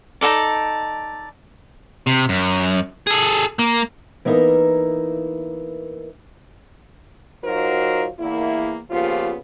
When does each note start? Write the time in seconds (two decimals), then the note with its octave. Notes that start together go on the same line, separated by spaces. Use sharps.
0.21 D#4 E4 A4 D5
2.07 C3
2.29 F#2
3.07 G#4 A4
3.59 A#3
4.25 E3 A#3 B3 D#4 E4 A#4
7.44 F#3 D#4 F4 F#4 A#4 C5
8.19 E2 A#3 E4
8.91 C#3 F3 A#3 B3 F4 G4